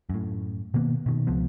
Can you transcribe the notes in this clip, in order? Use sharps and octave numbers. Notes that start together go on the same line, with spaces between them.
F#2 A2
B2 D#3 A#3 B3
B2 D#3
C#2 C3 F3 B3